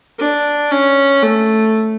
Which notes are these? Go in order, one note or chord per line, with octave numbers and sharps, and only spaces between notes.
D4
C#4
A3